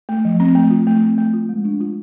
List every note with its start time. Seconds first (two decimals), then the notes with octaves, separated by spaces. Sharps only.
0.09 A3
0.25 F3
0.40 C4
0.55 A3
0.71 F4
0.87 A3
1.03 C4
1.18 A3
1.34 F4
1.49 G#3
1.65 D4
1.80 F4